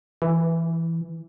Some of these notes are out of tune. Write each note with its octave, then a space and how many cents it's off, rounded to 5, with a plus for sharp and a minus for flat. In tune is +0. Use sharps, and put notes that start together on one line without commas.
E3 +5